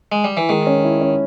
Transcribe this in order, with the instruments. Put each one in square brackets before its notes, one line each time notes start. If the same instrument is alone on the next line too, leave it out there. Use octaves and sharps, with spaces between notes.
[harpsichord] G#3
G3
E3
[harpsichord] D#3 [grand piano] G#3
[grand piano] C#4
E4
C#4